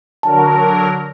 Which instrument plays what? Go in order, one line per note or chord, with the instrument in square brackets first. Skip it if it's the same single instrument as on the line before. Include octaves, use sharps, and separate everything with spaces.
[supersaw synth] D3 F#3 A#4 [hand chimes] A5